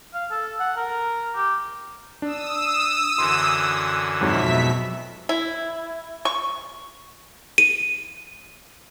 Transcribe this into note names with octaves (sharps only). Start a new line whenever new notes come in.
F5
A4
F#5
A#4
G4
D4 D#6 E6
F#2 D3 E3 C6
F2 G#2 B2 F#3 E5 B6
E4
C#6
D#7